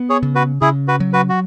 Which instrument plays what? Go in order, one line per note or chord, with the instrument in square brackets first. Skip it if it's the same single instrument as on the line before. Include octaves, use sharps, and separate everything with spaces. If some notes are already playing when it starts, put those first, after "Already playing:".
Already playing: [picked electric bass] B3
[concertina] G#4 C#5
[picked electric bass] C#3
[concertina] F#4 B4
[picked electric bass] C#3 [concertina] E4 G#4
[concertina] F#4 B4
[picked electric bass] F#3
[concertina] F#4 B4
F#4